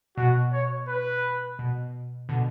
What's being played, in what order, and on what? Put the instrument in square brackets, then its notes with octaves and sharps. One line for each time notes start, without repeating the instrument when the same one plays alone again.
[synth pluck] B2 [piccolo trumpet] F#4
[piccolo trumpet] C#5
B4
[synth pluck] B2
B2 D3